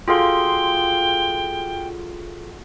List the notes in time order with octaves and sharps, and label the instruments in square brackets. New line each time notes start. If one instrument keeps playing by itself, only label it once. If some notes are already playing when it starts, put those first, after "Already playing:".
[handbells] F4 G#4 A4 [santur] F#4 F5 C6 [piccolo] G5